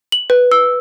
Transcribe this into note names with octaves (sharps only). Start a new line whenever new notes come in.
F#7
B4
E6